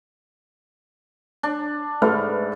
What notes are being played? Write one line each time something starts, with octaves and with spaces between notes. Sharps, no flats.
D4
G#2 A3 B4 F6